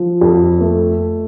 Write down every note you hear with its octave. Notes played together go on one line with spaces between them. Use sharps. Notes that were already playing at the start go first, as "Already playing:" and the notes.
Already playing: F3
F2
A3